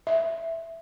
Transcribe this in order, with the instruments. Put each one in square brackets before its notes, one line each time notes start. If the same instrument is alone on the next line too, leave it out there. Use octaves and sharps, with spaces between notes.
[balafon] E5